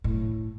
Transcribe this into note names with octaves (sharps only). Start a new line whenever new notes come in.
A2